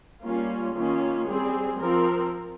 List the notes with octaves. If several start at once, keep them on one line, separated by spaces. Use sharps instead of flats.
G3 A#3 C#4 F4
D#3 A#3 C#4 F4
G3 C4 G#4
F3 C4 A#4